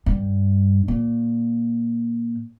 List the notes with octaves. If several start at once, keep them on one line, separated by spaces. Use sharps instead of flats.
G2
A#2